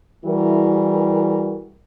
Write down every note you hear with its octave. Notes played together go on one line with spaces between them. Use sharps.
E3 G3 E4 F#4 G#4 A#4